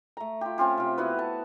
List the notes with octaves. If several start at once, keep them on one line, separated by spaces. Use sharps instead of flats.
A3 A#5
F4 G4
C4 C#4 F4 G4
C3 F4
B3 E4 F#4 B4
A5